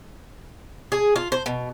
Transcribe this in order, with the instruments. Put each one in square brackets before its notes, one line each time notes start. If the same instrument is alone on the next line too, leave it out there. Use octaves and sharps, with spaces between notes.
[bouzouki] G#4
F4
C5
B2